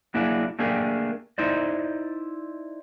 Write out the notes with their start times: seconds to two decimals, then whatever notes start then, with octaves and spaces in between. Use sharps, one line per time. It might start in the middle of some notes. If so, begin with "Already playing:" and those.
0.14 F#3 A#3 D4 E4 G#4
0.59 A3 A#3 D4 G4 G#4 A#4
1.38 D#4 E4 C5 D5